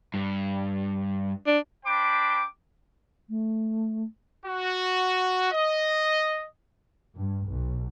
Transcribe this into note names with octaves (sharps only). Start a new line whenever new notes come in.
G2
D4
D4 C5 G5 B5 D6
A3
F#4
D#5
G2
B1